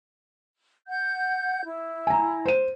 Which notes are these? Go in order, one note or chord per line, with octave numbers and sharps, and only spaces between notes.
F#5 G6
E4
G#5 A#5
C5 D#7